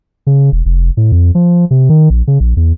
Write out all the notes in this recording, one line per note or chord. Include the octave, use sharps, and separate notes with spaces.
C#3
E1
F1
A2
F2
F3
C3
D#3
A#1
C#3
A#1
E2